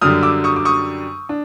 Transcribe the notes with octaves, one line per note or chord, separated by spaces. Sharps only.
F#2 D3 G3 D#6 F6
D6 E6
C#6 D#6
D6
C#6 D#6
D4